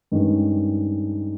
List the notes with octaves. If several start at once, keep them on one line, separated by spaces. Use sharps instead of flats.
G2 D#3 G#3 C#4